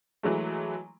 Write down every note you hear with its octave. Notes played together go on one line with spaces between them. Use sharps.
E3 F#3 G#3 A3